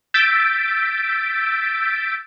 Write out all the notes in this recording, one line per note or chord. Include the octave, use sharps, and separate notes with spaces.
E6 G6 A6 B6 D7